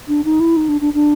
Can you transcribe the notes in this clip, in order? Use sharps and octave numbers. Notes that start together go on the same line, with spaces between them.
D4
D#4
E4
D#4
D4
D4
D4